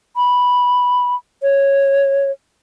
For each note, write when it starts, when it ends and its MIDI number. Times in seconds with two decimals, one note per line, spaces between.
0.16 1.15 83
1.43 2.31 73